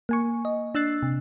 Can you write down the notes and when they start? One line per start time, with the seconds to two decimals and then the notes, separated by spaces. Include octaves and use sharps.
0.09 A#3 G#5 C#6
0.45 D#5
0.75 D4 E6 F#6 A6 C7
1.03 C3